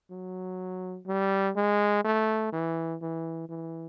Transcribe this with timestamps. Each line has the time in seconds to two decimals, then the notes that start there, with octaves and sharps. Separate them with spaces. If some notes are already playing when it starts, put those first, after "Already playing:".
0.10 F#3
1.07 G3
1.56 G#3
2.04 A3
2.52 E3
3.02 E3
3.49 E3